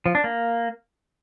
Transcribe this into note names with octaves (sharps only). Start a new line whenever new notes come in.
F3
D4
A#3